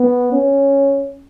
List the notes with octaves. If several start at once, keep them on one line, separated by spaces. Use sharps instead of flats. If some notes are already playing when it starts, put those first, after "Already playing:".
Already playing: B3
C#4